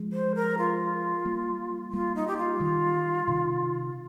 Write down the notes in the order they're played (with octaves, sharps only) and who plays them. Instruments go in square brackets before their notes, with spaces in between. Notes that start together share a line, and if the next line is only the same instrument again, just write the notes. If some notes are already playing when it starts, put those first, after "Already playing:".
Already playing: [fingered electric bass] F3 G#3
[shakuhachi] C5
A#4
F4
[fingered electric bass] G3 A#3
[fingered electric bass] G3 A#3 [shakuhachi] F4
[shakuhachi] D#4
G4
F4
[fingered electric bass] D#3 G3
C3 D#3